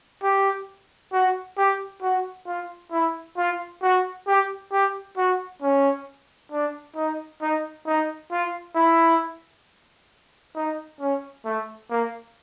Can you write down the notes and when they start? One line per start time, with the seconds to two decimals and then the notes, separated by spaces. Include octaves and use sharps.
0.23 G4
1.13 F#4
1.57 G4
2.02 F#4
2.47 F4
2.92 E4
3.37 F4
3.82 F#4
4.27 G4
4.72 G4
5.17 F#4
5.62 C#4
6.52 D4
6.96 D#4
7.42 D#4
7.87 D#4
8.31 F4
8.75 E4
10.55 D#4
11.00 C#4
11.45 A3
11.90 A#3